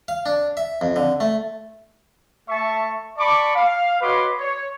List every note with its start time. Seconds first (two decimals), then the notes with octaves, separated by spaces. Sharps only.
0.08 F5
0.26 D4
0.57 E5
0.81 F2
0.96 D3
1.20 A3
2.49 A3 E5 A5 C#6
3.18 D5 A5 B5 C#6 D6
3.55 F5
4.01 F#4 B4 C#5 D#5 C6 D6
4.39 C#5